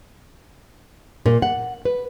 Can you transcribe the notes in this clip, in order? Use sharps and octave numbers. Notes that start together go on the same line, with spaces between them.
A#2
F#5
B4